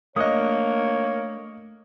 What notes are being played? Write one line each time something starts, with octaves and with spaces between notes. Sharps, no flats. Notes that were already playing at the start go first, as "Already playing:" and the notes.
A3 A#3 D4 C#5 D#5 D#6 F#6